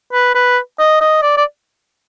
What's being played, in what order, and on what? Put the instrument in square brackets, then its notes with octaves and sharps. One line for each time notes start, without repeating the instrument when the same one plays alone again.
[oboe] B4
B4
D#5
D#5
D5
D5